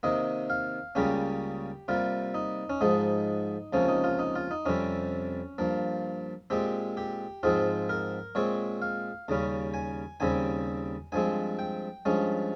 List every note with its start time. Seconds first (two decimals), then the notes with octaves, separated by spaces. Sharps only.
0.03 C3 D#3 A#3 D#5
0.50 F5
0.95 C#2 C#3 G3 A#3 C#4 G4
1.88 C3 G3 A#3 F4
2.34 D#4
2.70 C#4
2.81 G#2 F3 G#3 D#4
3.73 C#2 C3 F3 A#3 C#4
3.89 D#4
4.04 F4
4.19 D#4
4.35 F4
4.51 D#4
4.65 F2 C3 G3 C4 C#4
5.58 G2 F3 A#3
6.50 A#2 G#3 C4 G4
6.97 G4
7.43 G#2 F3 G#3 C4 F4
7.89 A#4
8.35 A#2 G#3 C4 C#5
8.82 F5
9.28 D#2 C#3 G3 C#4
9.74 G#5
10.20 D#2 C#3 G3 C4 G#5
11.12 G2 F3 G#3 C4 G#5
11.59 G5
12.05 G2 F3 G#3 C#4